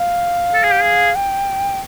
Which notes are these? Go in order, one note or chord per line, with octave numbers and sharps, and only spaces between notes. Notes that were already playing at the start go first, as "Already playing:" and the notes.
Already playing: F5
A4
G#4
G4
G#4
G5